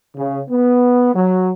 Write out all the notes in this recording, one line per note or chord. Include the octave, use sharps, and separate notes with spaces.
C#3
B3
F#3